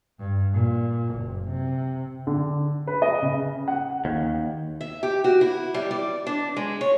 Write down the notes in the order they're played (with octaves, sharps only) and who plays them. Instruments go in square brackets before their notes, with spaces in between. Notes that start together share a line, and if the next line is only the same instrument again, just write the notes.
[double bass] G2
A#2
F#1
C3
[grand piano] D3
B4
D#5
C#3
F#5
[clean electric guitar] D#2
[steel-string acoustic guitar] E5
G4
F#4
E4
G3
D5
D4
G#3
C#5